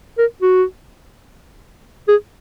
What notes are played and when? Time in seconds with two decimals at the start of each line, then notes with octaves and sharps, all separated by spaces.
0.18 A#4
0.42 F#4
2.08 G#4